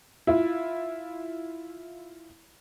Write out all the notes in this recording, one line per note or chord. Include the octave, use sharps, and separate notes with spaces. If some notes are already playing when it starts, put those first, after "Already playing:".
E4 F4